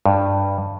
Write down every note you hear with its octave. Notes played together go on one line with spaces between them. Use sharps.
G2